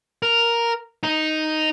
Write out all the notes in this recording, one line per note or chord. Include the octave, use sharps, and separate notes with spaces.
A#4
D#4